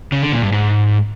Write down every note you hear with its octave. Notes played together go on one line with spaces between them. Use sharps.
C#3
D3
A#2
G2
G#2